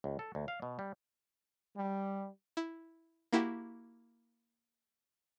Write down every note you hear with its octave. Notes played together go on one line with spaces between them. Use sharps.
C#2
A4
D2
F5
B2
G3
G3
E4
A#3 E4 F#4 G4